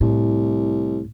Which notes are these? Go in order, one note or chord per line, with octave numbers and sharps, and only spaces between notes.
C2 A2